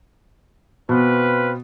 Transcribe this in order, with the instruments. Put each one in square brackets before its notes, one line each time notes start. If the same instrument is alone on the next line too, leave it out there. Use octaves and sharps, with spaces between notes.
[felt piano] B2 [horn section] C4 F4 B4